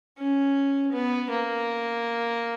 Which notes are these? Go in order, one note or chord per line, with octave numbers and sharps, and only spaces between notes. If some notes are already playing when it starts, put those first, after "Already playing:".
C#4
B3
A#3